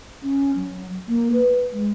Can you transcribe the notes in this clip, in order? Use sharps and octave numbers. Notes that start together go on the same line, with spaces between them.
C#4
F#3
A#3
B4
G#3